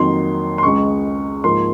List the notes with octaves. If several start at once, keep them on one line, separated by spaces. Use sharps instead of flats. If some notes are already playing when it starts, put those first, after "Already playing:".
Already playing: F2 D#3 F#3 A#3 C6
C6
C#2 C#3 G#3 C#6
G#2 F3 A#3 C6